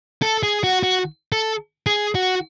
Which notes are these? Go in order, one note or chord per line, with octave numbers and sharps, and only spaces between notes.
A4
G#4
F#4
F#4
A4
G#4
F#4